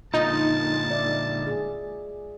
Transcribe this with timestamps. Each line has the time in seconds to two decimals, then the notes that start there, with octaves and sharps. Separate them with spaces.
0.14 A#2 D3 D#4 F4 D#5 A5
0.91 D5 E5
1.47 G#4